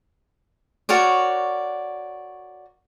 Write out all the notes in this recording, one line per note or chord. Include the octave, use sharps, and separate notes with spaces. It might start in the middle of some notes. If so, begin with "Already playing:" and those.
F#4 A#4 C#5 D5